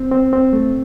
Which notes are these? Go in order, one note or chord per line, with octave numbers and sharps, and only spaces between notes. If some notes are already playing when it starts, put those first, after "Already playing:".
Already playing: C4
C4
C4
A3